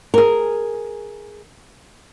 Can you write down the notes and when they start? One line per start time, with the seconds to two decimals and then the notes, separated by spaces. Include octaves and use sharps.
0.14 G#4 A#4